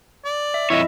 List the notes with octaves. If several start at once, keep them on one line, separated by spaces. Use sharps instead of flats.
D5
E5
F2 E4 C#5 D#5 E5